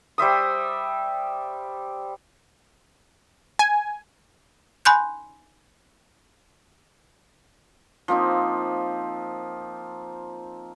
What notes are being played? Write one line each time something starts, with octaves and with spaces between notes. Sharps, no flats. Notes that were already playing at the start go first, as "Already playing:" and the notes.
G3 C5 E5 D#6
G#5
G#5 B5 C6 F#6 G6
F3 A#3 C4 D#4